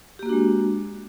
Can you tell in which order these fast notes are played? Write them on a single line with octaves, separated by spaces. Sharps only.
G4 A#3 F#4 D4 G#3